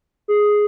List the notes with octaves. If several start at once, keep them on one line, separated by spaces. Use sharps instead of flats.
G#4